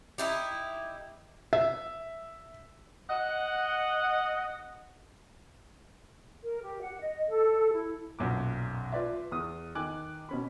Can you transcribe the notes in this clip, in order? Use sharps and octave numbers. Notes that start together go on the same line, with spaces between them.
D#4 E4 G4
E5
D#5 F#5
A#4
G4
F#5
D#5
A4
E4
B1 F#2 A#2 D6
F4 B4 D5 E5
E2 D#6
D#3 G#5 D6 F#6
B2 C#4 B5